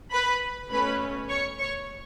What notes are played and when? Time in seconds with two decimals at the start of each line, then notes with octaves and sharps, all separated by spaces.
0.11 B4 B5
0.70 B2 A3 C#4 B4 B5
1.29 C#5 C#6
1.59 C#5 C#6